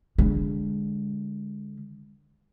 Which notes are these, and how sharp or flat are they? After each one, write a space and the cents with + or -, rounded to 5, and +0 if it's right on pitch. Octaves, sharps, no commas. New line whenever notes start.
D3 -10 G#3 -20